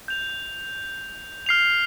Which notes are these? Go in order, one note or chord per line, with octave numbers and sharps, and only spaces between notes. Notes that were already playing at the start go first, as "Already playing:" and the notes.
G6 F7
F6 C7 F7